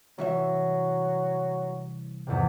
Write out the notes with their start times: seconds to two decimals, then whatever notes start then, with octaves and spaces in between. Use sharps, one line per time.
0.18 C2 E3 F#3 E5
2.27 E2 G#2 C3